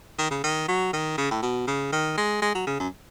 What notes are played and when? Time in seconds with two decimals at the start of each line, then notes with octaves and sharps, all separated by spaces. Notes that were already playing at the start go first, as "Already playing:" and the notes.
0.18 D#3
0.31 C#3
0.44 D#3
0.68 F#3
0.93 D#3
1.17 C#3
1.31 A2
1.43 B2
1.67 C#3
1.92 D#3
2.17 G#3
2.42 G#3
2.55 F#3
2.67 C#3
2.80 F#2